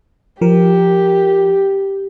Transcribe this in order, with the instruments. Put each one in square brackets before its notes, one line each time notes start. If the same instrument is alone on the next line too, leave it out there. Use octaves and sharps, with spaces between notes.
[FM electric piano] F3 A#4 [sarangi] G4